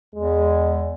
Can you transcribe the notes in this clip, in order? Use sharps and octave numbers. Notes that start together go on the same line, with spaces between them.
E2 G#3